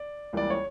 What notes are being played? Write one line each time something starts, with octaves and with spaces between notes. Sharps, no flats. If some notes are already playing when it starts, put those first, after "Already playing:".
Already playing: D5
C#2 C#3 E3 G3 A#3 D5
C#5